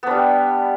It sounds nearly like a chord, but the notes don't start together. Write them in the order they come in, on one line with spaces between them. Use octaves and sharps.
B3 D4 G3